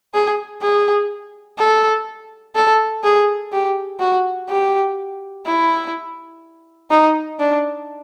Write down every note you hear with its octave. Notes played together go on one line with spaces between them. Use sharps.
G#4
G#4
A4
A4
G#4
G4
F#4
G4
E4
D#4
D4